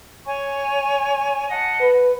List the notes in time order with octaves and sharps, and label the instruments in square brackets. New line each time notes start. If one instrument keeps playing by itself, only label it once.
[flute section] C#5 G#5 C#6
D#5 F#5 A5
[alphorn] B4